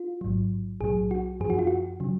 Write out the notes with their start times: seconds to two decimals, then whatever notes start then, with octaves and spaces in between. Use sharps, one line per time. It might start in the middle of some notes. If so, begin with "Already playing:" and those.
Already playing: F4
0.21 A1 G#2 F#3
0.80 B1 A2 F#3 G#4
1.11 F#4
1.40 F#2 F3 G#4
1.50 F#4
1.59 F4
1.67 F#4
2.00 C#3 F#3